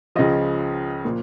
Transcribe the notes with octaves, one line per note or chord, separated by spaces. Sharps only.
C#2 C#3 F3 D#5
A#2 F3